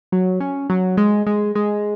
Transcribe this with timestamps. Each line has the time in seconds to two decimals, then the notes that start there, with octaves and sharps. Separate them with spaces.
0.12 F#3
0.40 C#4
0.70 F#3
0.97 G#3
1.27 G#3
1.55 G#3